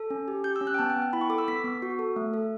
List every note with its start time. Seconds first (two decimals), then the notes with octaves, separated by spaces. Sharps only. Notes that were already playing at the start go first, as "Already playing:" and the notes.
Already playing: A4
0.10 C#4
0.28 G4
0.44 G4 G6
0.56 E6
0.61 C#4
0.67 F#6
0.74 G5
0.79 B3 A5
0.90 G5
0.96 B3
1.02 G5
1.13 E4 B5
1.21 C#6
1.30 A4 D6
1.38 E6
1.48 B3 B6
1.64 B3
1.82 F#4
1.99 A4
2.16 A3
2.34 A4